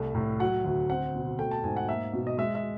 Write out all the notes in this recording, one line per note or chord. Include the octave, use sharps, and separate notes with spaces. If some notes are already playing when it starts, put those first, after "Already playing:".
Already playing: C2 A3
A2
F#3 F#5
D2
C4 F#5
B2
A3 G5
A5
G#2 G#5
F#5
A#3 E5
B2
D#5
G#3 E5
E5